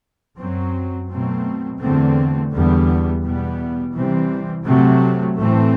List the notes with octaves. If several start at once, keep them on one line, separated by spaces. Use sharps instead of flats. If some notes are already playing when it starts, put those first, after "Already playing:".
F#2 F#3 C4
B2 F#3 A3 C4
E2 D3 A3 C4
E2 D3 G3 B3
E2 B2 G3 B3
C3 E3 G3 C4
C3 F#3 A3 C4
A2 E3 A3 C4